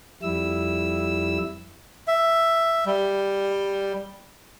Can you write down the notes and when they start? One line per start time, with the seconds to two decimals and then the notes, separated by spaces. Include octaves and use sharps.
0.23 F2 G3 E4 E6
2.08 E5
2.86 G3